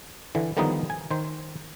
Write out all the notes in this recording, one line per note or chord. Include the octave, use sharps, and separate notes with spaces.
D3 E3
D3 D#3 F3 G3 B3 D#4
G#5
D#3 C5